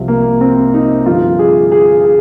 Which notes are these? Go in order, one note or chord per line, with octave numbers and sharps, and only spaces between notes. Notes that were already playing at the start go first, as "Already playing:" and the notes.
Already playing: C2 C3 F3
A#3
C4
D#4
G2 D3 F3 F4
G#4
G#4
G#4